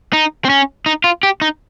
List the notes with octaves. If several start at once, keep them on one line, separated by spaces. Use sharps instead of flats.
D#4
C4
C#4
D#4
F4
G4
D#4